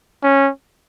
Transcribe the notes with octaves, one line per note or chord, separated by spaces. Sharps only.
C#4